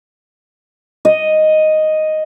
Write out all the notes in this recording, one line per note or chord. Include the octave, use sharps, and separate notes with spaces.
D#5